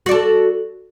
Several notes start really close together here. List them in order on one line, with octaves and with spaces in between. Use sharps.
F#4 D5 A4